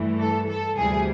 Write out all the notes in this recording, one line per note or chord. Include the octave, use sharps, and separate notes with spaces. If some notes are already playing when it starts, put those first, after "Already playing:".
Already playing: G2 E3 A3
A4
A4
D2 C3 E3 G3 G#4